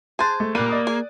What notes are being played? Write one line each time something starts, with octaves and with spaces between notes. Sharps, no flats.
G#4 C5 A5 F#6 A6
A3
A#2 G3 A#3 F#6 D#7
D5 D#6
G#4